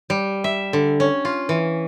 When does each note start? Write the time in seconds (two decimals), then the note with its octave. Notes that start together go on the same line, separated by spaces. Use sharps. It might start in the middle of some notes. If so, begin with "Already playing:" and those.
0.10 G3
0.44 E5
0.73 D3
1.00 C#4
1.25 F4
1.49 E3